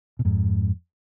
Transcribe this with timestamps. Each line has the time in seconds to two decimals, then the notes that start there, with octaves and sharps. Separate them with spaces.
0.19 B2
0.25 F2 G#2